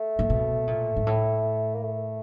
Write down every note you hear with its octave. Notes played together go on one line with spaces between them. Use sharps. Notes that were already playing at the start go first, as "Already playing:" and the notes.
Already playing: A3
A#2
B2
A#2
G#2
A2
A#3
A3